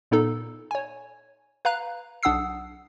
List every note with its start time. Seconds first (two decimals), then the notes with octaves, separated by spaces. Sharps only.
0.11 A#2 B3 D#4 A4
0.71 C#5 G#5
1.65 B4 F5 A#5 F#6
2.23 B1 D4 F#5 D#6 E6 C7